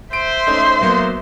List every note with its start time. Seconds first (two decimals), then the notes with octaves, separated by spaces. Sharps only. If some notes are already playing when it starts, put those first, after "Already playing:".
0.13 C5 E5 C6 D7
0.47 A3 C#4 D#4
0.81 F#3 A#3 B3